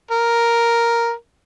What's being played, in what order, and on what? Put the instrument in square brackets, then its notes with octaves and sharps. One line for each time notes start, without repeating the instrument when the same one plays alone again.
[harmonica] A#4